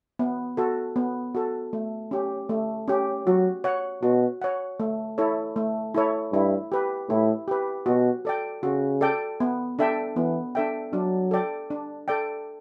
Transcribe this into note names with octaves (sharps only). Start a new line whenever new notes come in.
B3
F#4 A4
B3
F#4 A4
A3
C#4 G4
A3
C#4 G4
F#3 F#4
C#5 F#5
B2 F#4
C#5 F#5
A3
E4 A4 C#5
A3
E4 A4 C#5
G2 E4
G4 B4
A2 E4
G4 B4
B2 F#4
A4 D5 G5
C#3 F#4
A4 D5 G5
B3
D4 A4 E5 G5
E3 B3
D4 A4 E5 G5
F#3 D4
A4 D5 G5
D4
A4 D5 G5